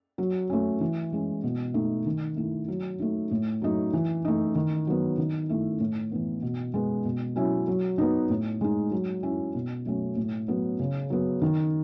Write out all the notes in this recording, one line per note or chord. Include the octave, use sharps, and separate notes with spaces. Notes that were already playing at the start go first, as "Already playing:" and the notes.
F#3
A3 C#4
E3
G#3 C#4
B2
A3 D#4
D#3
A3 E4
F#3
A3 D#4
A2
F#3 A3 D#4
E3
A3 D#4
D#3
F#3 B3
D#3
A3 E4
A2
E3 B3
B2
G#3 B3
B2
F#3 C#4 E4
F#3
B3 D#4
A2
G#3 D#4
F#3
C#4 E4
B2
F#3 A3 C#4
A2
F#3 B3
C#3
F#3 B3
D#3